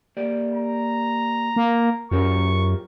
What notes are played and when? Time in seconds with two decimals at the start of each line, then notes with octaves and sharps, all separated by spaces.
0.17 A#3 G4 D5
0.54 A#5
1.56 A#3
2.11 F#2 F4 G4 A#4 C#6